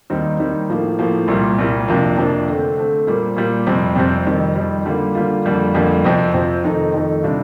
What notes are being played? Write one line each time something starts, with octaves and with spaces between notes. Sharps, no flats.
D#2 D#3 G3 C4 D#4
D#2 D#3 G3 C4 D#4
A2 F3 A#3
A2 F3 A#3
C2 A#2 G3
C2 A#2 G3
F2 C3 F3 A#3 D4
F2 C3 F3 A#3 D4
D3 A3 C4
D3 A3 C4
A#2 G3 A#3
A#2 G3 A#3
F2 C3 G3 C4
F2 C3 G3 C4
F2 D#3 G3
F2 D#3 G3
D3 G3 A#3 F4
D3 G3 A#3 F4
F2 D3 G3 A#3
F2 D3 G3 A#3
F2 C3 F3 C4
F2 C3 F3 C4
F2 D#3 A3 D#4
F2 D#3 A3 D#4
C3 G3 D4 F4